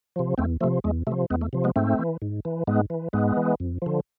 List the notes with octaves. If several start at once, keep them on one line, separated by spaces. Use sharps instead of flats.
C3 F3
E2 A3 C4
C3 F3 A3
E2 G#3
C3 F3 A3
E2 G#3 B3
A3
C3 F3
G#3 B3
G#2 A3 C4
E3
G#2
E3
G#2 G#3 B3
E3
G#2 G#3 B3
E3
F2
D3 F3